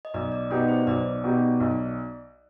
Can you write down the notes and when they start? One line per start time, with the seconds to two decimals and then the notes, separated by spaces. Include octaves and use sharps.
0.05 D#5
0.14 B1 D5
0.32 D5
0.51 B2 B3 D#4 G4 D5
0.68 C5
0.87 B1 D5
1.24 B2 B3 D#4 G4
1.60 B1